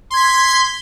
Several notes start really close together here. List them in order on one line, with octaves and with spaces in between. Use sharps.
C6 G#6 B6